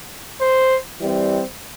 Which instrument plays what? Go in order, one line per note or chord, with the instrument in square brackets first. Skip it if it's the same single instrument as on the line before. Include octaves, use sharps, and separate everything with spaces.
[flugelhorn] C5
[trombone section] E3 G3 C4